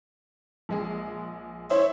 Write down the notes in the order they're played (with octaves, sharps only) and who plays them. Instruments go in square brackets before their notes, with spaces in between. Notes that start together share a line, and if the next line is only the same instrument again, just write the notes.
[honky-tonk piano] A#1 G#3 G#4
[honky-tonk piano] E4 C5 E5 [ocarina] C#5